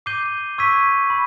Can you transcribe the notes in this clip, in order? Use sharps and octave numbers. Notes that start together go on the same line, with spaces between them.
D6 G6 C7 D#7 G7
C#6 E6 G#6 B6 D#7
B5